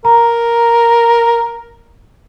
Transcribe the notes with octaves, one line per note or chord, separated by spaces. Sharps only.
A#4 A#5